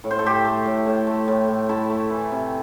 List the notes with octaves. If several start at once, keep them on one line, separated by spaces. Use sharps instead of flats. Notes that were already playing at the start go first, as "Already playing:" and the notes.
A2
C5
A4
A2 G4 C5
A3
A2
A2
A3
A2
A2
A3 E4 A4
A3
E3
C3